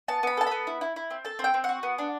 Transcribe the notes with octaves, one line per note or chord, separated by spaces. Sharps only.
B3 A5
B3 B5
A4 A5
B3 B5
E4
E4
E4
C4
A4 A5
C4
G5
C4
F#4 F#5
B3
D4